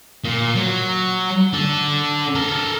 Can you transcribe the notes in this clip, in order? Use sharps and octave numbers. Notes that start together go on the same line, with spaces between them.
A#2
F#3
D4 A4
A4 A#4